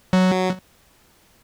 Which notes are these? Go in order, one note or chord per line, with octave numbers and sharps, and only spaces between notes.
F#3